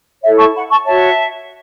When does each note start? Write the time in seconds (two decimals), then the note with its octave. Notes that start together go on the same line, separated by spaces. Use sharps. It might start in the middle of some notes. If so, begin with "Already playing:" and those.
0.22 E4 A4 C#5 E5
0.38 A5 C#6
0.54 F#5 B5
0.70 A5 C#6
0.85 F#4 C#5 E5 A5